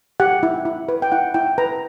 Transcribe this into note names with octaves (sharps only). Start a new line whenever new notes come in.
G4 F#5
E4
E4
B4
G5
E4 F#5
E4 G5
B4 A#5